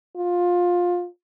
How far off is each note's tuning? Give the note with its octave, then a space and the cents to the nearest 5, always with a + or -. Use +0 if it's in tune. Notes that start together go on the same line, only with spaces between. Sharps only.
F4 +15